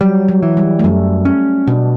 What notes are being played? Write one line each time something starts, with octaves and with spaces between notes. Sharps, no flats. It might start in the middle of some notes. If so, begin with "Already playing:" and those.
F#3 G3
F#3
E3
G3
A3
F#2 G3
C#4
B2 D4